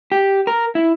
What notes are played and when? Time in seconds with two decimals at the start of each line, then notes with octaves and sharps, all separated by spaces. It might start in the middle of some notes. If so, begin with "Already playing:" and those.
0.12 G4
0.47 A#4
0.75 E4